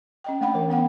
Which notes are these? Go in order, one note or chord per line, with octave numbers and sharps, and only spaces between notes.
C#4 D#5 G5
A3 A#3 D4 F#5 G5 B5
E3 A#4
B3 D4 F#5 G5